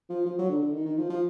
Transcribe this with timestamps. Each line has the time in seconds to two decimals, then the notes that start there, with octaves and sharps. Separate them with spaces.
0.10 F3
0.26 F3
0.38 F#3
0.50 D3
0.62 D3
0.73 D#3
0.85 D#3
0.98 F3
1.10 F3